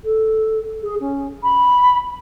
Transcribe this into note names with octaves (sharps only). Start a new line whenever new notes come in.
A4
G#4
C#4
B5